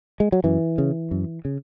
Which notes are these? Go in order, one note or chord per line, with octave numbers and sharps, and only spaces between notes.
G#3
F#3
F#2 E3
C#3
F#2
C#3